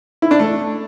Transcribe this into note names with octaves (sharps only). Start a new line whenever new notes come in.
E4
D4
A3